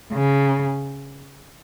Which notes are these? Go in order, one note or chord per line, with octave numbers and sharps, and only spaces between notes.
C#3